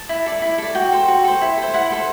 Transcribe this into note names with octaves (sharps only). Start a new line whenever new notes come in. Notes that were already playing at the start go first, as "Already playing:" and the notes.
Already playing: A5
E4
A4 D5
E4
A4 D5
F#4 G5
A4 C5
F#4
A4 C5
E4
A4 C5
E4 F#5
A4 C5